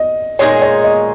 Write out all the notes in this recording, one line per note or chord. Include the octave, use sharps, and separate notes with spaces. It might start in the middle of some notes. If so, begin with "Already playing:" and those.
Already playing: D#5
A#2 G#3 D#4 G#4 C#5
C#5
D#5